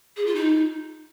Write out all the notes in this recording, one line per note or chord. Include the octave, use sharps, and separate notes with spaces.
G#4
F4
D#4